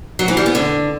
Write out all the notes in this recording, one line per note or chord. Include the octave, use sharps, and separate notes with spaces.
F#3
E3
G3
B3
D3